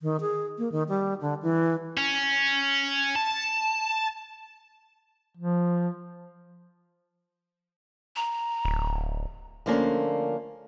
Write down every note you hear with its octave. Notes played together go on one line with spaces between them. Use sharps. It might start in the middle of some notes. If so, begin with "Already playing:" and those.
D#3
G#4
A#3
D#3
G3
D3
E3
C#4
A5
F3
A#5
D1
D3 F3 A3 A#3 C#4 D4